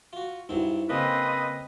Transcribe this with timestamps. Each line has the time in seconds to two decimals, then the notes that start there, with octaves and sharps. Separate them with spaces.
0.13 F4 F#4
0.49 G2 F#3 C4 D#4 E4
0.89 C#3 A#3 C4 D4 B4 C5 D#5